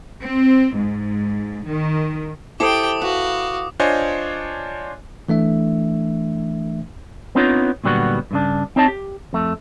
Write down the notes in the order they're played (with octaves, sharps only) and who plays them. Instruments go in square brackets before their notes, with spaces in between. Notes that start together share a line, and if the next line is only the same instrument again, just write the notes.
[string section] C4
G#2
D#3
[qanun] E4 A4 C5 [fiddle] G4 G5 [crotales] D6 D#6
[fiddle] F#4 F5 [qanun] B4
[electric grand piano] D4 F4 C5 C#5 D#5 G#5
[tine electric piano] E3 A3 D4 E5
[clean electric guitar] B3 C4 D4 D#4 F4 C#5
A#2 D3 F#3 G3 B3 F#4
G2 C#3 D4
C4 D#4 C#5 D#5 A5
G4
F2 A3